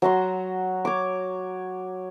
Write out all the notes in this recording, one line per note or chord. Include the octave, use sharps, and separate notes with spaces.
F#3 F#4 A#5 C6
C#5 D6